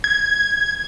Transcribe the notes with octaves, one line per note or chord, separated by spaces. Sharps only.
G#6